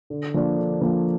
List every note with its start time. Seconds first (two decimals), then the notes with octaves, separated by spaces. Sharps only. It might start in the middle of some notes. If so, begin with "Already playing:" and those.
0.10 D3
0.34 F3 A#3 D4
0.58 D3
0.81 F3 A#3 D4